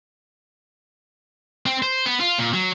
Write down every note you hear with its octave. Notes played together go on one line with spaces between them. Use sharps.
C4
C5
B3
F4
A#2
F#3